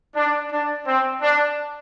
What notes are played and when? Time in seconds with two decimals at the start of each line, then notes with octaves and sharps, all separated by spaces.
0.16 D4
0.52 D4
0.87 C4
1.22 D4